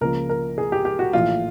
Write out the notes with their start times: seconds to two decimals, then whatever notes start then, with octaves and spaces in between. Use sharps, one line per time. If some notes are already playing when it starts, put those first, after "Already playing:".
0.01 C#2 C#3 F3 A#3 A#4
0.29 A#4
0.58 G#4
0.72 G4
0.85 G4
0.99 F#4
1.13 A#1 A2 E3 F4